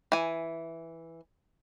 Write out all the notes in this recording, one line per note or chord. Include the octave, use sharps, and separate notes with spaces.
E3 G#5